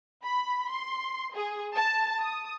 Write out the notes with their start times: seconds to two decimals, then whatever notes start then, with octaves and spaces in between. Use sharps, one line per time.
0.23 B5
0.68 C6
1.34 G#4
1.73 A5
2.21 D#6